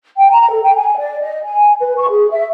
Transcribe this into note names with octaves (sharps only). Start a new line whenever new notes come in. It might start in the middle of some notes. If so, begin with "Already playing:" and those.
G5
A#5
A4
G5
G#5
D5
D#5
G#5
B4
C#6
G#4
E5